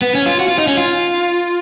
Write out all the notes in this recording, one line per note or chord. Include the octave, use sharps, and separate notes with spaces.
B3
C#4
F4
F#4
F4
D#4
C#4
F4